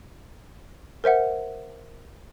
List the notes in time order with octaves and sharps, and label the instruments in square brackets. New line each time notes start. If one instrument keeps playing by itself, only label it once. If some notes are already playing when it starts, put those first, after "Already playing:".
[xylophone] A#4 C5 E5 F#5